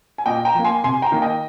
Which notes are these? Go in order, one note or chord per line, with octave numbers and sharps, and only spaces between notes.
G#5
A#2 D#5 G5
G5 A#5
F3 A#3
G#5 C6
C3 G#5 C6
G5 A#5
D#3 A#3
D#5 G5